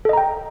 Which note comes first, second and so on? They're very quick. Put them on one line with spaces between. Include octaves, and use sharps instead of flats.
A4 D#5 A#5 G5